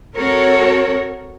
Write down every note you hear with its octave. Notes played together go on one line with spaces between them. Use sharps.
C4 F#4 A4 A#4 C#5